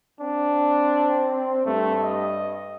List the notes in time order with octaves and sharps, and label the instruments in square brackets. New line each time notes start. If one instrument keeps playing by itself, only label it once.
[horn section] C4 [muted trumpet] D4
[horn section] G2 [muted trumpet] A3
[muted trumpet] D#5